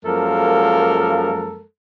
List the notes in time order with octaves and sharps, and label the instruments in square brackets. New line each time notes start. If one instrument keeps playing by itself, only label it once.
[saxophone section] F#2 F3 G#3 A#3 A4 A#4